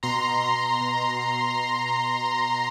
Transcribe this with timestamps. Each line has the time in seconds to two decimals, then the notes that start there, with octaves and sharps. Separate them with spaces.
0.03 B2 A#5 C6
0.29 B2
0.55 B2
0.81 B2
1.07 B2
1.34 B2